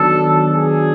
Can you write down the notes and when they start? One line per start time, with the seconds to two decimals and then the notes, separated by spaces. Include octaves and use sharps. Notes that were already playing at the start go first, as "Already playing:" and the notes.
Already playing: D#3 F#3 B3 D4 A4
0.53 G#4